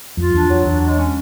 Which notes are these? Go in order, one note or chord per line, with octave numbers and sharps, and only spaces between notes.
F2 F4
E2 D4
E2 F#3
E2 D4
G#3
C#4